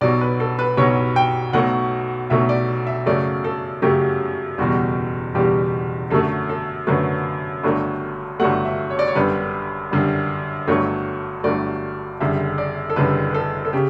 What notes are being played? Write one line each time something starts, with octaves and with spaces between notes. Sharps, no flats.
B1 B2 F#3 D5
B4
A4
B4
B1 B2 F#3 C#5
G5
B1 B2 F#3 A3 F#5
B1 B2 F#3 A3 E5
D5
E5
F#2 C#3 F#3 A3 D5
A4
F#2 C#3 F#3 A3 G4
F#1 E2 B2 G3 F#4
F#1 E2 B2 G3 G4
F#2 D3 F#3 A3 A4
A4
F#2 D3 F#3 A3 B4
G1 G2 F#3 A3
G1 G2 F#3 A3 F#5
E5
C#5
D5
C#5
G1 F#2 D3 G3 B4
G1 F#2 D3 G3
G1 G2 F#3 A3 C#5
G1 G2 F#3 A3 D5
F#1 F#2 D3 G3 E5
D5
A4
F#1 F#2 D3 G3 B4
B4
A4
A4
C#3 G4